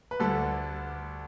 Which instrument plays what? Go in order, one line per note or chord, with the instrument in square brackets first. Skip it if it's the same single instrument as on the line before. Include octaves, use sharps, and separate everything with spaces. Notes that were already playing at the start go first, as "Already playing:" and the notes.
[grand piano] B4
D2 D3 G3 A4